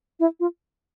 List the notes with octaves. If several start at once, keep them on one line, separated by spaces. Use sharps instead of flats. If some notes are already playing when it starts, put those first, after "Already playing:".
E4
F4